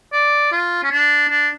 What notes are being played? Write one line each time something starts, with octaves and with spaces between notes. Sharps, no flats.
D5
F4
C#4
D4
D4